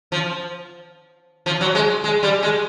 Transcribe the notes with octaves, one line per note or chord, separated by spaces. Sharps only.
F3
F3
F#3
G#3
G#3
G3
G#3